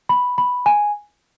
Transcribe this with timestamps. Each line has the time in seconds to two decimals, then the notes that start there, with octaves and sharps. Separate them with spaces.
0.09 B5
0.38 B5
0.66 G#5